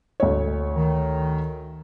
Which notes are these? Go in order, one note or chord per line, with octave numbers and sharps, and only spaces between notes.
D2 C#5
D#3